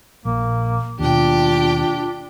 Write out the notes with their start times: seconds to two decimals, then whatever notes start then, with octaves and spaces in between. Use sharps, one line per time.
0.25 A#1 A#3
0.99 D#2 B2 D4 F4 G4 G5